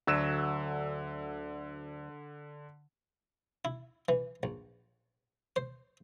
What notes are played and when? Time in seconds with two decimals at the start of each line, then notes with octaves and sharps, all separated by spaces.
0.07 D2 D3 F#3 E6 E7
3.65 E4
4.09 E3
4.43 A#1
5.56 C5